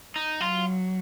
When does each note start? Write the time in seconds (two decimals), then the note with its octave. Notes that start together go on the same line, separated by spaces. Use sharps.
0.16 D#4
0.40 F#3 F4